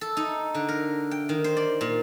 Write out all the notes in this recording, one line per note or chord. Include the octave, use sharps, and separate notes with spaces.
A4
D#4
D3
A#4
G5
D#3
C5
D5
A#2